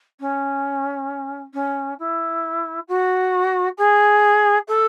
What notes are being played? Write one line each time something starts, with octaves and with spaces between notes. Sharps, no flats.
C#4
C#4
E4
F#4
G#4
A4